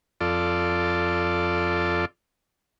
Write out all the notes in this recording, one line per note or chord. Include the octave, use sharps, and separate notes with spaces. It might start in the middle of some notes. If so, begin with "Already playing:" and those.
F2 F4 A4 D5